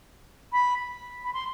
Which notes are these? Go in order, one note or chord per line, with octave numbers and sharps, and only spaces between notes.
B5
B5
C6